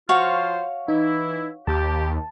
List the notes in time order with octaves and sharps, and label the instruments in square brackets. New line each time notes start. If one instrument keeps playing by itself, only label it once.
[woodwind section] F3 F4 C5 [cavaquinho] F#4 C#5 F5
[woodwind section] E3 E4 [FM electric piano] D#4
[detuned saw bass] D#2 [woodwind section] G4 [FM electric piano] A5